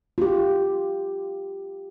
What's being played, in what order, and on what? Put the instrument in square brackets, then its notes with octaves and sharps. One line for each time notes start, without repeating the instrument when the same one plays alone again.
[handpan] F4 G4